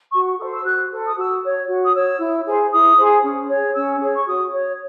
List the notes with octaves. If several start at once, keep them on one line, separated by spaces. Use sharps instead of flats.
F#4 C#6
A4 C5 D#6
E6
F#4 F#6
A4 C5
D#6
F#4 E6
C#5
F#4
D#6
C#5 E6
E4
G#4 C5
E4 D#6
G#4 C5
C#4
G#4 C#5
C#4 E6
G#4 C#5
C#6
F#4 D#6
C#5